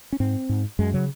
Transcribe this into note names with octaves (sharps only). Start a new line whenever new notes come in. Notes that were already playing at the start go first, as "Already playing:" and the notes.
C#4
G#2 C4
G#2
F#2 G#3
C#3 F#3